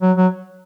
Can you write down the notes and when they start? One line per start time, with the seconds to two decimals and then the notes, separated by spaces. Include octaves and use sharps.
0.02 F#3
0.17 F#3